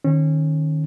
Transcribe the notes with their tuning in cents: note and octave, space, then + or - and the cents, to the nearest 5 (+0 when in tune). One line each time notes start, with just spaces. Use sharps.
D#3 -15 C#4 -30